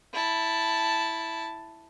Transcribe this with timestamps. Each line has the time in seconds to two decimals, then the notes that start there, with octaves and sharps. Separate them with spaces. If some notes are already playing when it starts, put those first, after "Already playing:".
0.14 E4 A5